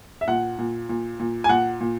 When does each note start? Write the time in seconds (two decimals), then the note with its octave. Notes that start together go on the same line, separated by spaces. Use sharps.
0.21 E5
0.28 A#2 F#5
0.59 A#2
0.89 A#2
1.20 A#2
1.44 G#5
1.49 A#2 F#5
1.81 A#2